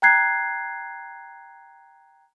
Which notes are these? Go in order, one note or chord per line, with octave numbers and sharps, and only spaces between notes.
G5 A#5 F#6 G#6 C7